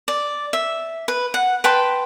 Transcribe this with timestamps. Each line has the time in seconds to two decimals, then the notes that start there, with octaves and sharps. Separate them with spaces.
0.08 D5
0.53 E5
1.08 B4
1.34 F#5
1.64 B4 G5 A5 C6